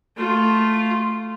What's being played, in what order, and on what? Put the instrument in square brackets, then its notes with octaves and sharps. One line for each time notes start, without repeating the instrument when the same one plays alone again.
[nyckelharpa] A3 F4